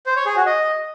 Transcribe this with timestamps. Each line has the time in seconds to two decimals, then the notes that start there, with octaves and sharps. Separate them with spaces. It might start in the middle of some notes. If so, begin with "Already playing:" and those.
0.06 C5
0.16 C#5
0.26 G#4
0.36 F#4
0.46 D#5